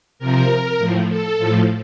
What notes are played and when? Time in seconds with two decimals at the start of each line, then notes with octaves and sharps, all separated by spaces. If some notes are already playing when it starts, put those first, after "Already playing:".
0.19 C3 F3 A#4
0.78 A2 F3
1.08 A4
1.38 A2 F3